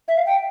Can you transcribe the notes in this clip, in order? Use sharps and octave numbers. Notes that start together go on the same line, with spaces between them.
E5
F5
G5